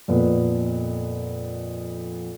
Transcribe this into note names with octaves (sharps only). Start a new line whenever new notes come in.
F2 A#2 B3